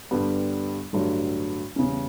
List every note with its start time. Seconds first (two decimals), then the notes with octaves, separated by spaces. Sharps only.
0.11 G2 D3 G3 B3
0.93 A1 G2 D3 F#3
1.76 E2 C#3 G3 C#4